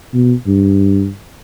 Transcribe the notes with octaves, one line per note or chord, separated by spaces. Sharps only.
B2
G2